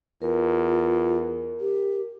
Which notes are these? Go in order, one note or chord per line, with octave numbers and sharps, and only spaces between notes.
E2 F4 A#4
G4